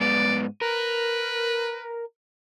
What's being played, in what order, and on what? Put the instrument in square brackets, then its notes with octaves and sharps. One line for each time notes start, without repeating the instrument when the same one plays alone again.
[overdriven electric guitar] G#2 B3 [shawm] D5
[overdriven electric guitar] A#4 [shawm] B4